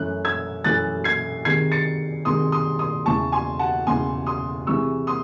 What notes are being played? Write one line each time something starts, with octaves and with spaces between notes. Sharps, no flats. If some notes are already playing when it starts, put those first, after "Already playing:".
Already playing: F#2 E3 A3 F#6
E6 G#6
F#2 E3 A3 F#6 A6
G#6 C7
C3 D#3 G#3 G#6 C7
A6 C#7
C3 D#3 G#3 C6 D#6
C6 D#6
C6 D#6
E2 C#3 E3 A5 C#6
G#5 C6
F#5 A5
E2 C#3 E3 G#5 C6
C6 D#6
C3 E3 G#3 C#6 E6
C6 D#6